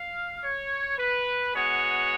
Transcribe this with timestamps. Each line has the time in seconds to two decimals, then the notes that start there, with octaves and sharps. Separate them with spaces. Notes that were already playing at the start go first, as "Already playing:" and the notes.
Already playing: F5
0.44 C#5
0.99 B4
1.54 G#3 B3 F#4 C#5